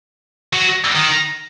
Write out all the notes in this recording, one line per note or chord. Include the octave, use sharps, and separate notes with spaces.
F#3
D#3